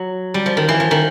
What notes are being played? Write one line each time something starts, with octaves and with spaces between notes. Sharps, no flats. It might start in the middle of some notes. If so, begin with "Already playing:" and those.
Already playing: F#3
G3
F3
D#3
E3
F3
D#3